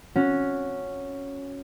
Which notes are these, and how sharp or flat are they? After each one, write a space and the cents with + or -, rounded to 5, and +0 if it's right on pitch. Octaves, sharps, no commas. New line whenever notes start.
C#4 +0 F#4 -15